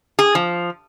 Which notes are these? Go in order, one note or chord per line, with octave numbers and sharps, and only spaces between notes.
G#4
F3